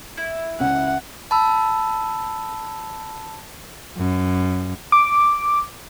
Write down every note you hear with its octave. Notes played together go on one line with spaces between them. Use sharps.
E4
C#2 C#4 F#5
A5 B5 E6
F#2
D6